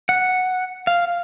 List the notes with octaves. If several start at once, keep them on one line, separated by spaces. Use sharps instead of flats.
F#5
F5